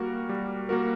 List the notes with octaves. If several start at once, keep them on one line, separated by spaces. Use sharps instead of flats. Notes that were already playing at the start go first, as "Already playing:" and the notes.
Already playing: G3 A#3 F#4 A#4
G3
A#3 F#4 A#4